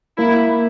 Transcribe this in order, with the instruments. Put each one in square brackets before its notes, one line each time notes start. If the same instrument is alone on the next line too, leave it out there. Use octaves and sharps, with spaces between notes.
[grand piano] A#3 [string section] E4